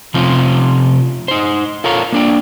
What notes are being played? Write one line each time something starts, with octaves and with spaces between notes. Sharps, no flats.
C3 F3 C4 C#4 F4 C5
D#4 C5
F4 A4 A#4 C#5 F5
A#3 D4 G5